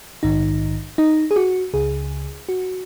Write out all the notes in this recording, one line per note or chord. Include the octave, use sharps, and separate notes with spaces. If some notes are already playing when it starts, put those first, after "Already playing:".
A#1 G#2 D#3 D#4
D#4
G#4
F#4
C#2 C#3 G#4
F#4